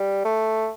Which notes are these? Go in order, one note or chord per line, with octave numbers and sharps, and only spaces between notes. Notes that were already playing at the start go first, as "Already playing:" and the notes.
Already playing: G3
A3